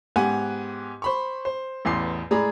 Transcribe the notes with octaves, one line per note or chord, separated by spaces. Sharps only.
G#2 B3 G4 F#5 G#5 F#6
C5 B5 C#6
C5
A1 E2 C6 C7
A2 G#3 G#4 D5 A#5 B5